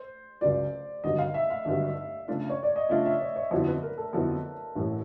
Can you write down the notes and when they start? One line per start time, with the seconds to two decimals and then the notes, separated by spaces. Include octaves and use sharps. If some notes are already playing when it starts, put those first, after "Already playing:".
Already playing: C5
0.41 C#2 C#3 F#3 D5
1.04 G#1 G2 D3 F#3 D#5
1.18 F5
1.34 E5
1.50 F5
1.65 G#1 G2 D3 F#3
2.28 C#3 F3 A3 D4 F4
2.50 C#5
2.63 D5
2.76 D#5
2.89 C#3 F3 A3 D4 F4 E5
3.05 E5
3.20 C#5
3.36 C#5
3.51 F2 D3 F#3 B3 E4 C5
3.67 B4
3.83 A#4
3.98 A4
4.13 F2 D3 F#3 B3 E4 A4
4.75 A1 A2 E3